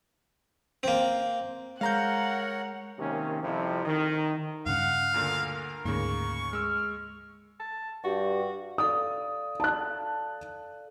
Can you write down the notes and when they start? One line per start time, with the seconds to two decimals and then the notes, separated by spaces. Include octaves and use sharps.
0.83 A#3 C4
1.81 G#3 A#4 C#5 F5 F#5 A#5 G6
2.99 C3 D#3 A#3 C#4
3.42 F2 C3 F3 G3 E4
3.85 D#3
4.66 G2 C#3 F5 F#5
5.14 D2 A#2 D3 A#4
5.85 D2 G#2 C#3 A#3 C#6
6.53 G#3 E6 F6
7.59 A5
8.04 G2 F#4 G4
8.78 A4 D5 F5 D#6
9.60 A5 F#6